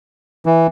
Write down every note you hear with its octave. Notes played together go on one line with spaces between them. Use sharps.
E3